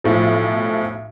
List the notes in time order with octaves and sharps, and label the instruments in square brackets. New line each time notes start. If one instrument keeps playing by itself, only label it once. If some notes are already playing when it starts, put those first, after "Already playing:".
[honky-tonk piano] B1 A2 F3